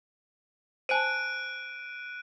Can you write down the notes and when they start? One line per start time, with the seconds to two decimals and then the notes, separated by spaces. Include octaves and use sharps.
0.89 C5 G#5 A5 F#6 D7 D#7